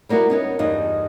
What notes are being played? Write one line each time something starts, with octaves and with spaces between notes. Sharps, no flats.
G3 A#3 B3 E4 F#4
B3 C#4 D#4
E2 G2 D#4 D#5